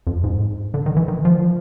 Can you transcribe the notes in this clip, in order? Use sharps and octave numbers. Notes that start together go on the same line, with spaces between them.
F2
G#2
D3
D#3
E3
D#3
F3